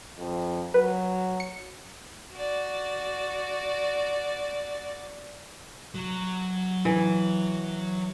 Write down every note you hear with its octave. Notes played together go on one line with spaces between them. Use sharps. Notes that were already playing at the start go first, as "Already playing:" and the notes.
F2
F#3 B4
C#7
F#4 D5
F#3
E3